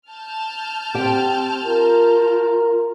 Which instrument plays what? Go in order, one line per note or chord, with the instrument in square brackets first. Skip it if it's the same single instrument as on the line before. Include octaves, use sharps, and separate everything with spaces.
[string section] A5 F6 G6
[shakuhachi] C4 [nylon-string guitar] G4 G5
[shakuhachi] F4 [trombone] A#4